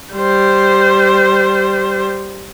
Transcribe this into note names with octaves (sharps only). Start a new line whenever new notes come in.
G3 C5